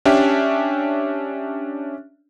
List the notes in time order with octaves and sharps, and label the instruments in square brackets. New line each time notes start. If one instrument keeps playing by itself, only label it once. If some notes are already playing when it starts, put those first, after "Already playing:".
[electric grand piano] C#4 D4 G4 E5